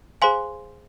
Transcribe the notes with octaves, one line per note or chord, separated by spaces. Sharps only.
G#4 C5 F5 G#5 C6